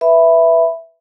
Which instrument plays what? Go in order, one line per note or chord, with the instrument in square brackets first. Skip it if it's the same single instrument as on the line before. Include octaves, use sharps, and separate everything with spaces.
[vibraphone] B4 E5 B5